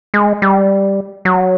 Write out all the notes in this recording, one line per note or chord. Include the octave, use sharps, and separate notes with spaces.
G#3
G3
F#3